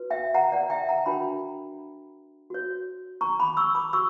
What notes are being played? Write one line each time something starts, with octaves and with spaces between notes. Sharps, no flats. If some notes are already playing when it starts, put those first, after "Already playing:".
Already playing: F#4 B4
E5 G5
F#5 A#5
D5 F#5
A#5
E5 G5
F#5 A#5
D4 F#4 A#4 C#5 G5 B5
F#4 C#5
A#5 C#6
B5 D6
C#6 E6
B5 D6
F#4 C#6 E6